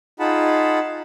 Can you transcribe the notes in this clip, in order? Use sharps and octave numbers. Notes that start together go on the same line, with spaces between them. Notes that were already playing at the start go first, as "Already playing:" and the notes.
D#4 F4 G#4 F#5 A5 B5